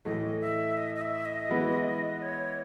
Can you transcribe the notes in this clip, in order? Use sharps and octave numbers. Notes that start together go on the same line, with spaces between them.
A2 E3 A3 D#5
E5
D#5
D#5
E5
D#5
E3 G#3 B3 E4 B4
C#5